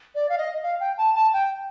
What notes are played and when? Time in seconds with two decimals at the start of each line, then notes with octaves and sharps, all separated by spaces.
0.15 D5
0.29 F5
0.38 D#5
0.63 F5
0.80 G5
0.98 A5
1.15 A5
1.33 G5